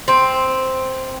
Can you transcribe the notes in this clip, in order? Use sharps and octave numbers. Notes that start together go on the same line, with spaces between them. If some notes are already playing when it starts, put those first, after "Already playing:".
C4